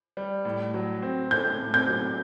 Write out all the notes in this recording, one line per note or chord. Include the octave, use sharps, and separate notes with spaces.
G3
A2
F#3
C4
A3 G6
A2
G6
F#3